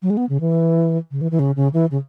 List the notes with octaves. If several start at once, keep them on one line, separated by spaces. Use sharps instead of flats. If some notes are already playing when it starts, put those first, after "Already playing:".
F#3
G#3
B3
C#3
E3
C#3
E3
E3
C#3
C#3
E3
C#3